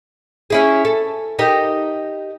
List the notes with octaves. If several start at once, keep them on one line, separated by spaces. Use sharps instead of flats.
C#4 E4 G#4
A4
D#4 G4 A#4